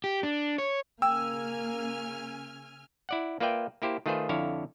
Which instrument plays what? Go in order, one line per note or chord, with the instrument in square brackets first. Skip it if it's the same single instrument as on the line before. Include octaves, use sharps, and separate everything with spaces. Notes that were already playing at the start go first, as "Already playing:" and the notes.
[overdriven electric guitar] G4
D4
C#5
[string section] C#3 G#5 F6 [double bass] A#3 [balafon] G5 [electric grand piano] E6
[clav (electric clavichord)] E4 D5 F#5
A#3 F4 B4 D5 E5 G5
A#3 E4 G4 C5
D#3 A3 F4 G#4 B4 C5
F2 D3 E4 C#5 F5